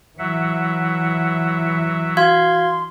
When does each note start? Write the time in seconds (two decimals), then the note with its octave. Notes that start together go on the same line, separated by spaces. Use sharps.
0.19 E3 F#3 E5 F#5
2.17 F#4 F5 C6 G#6